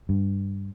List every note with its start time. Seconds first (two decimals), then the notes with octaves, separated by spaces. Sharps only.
0.09 G2